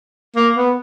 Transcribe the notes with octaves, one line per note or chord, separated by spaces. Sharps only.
A#3
B3